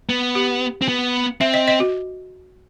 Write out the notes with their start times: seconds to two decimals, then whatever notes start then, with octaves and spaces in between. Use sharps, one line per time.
0.09 B3
0.35 G4
0.82 C4
0.88 B3
1.41 C4 E5
1.54 D#5
1.68 D#5
1.80 F#4